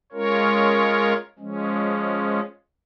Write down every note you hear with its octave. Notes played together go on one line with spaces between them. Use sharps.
G#3 C#4 F4 A#4 C#5
F3 G#3 C#4